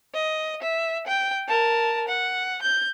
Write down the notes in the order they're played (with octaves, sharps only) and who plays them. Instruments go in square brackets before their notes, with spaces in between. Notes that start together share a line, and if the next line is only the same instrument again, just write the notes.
[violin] D#5
E5
G5
A#4 A5
F#5
G6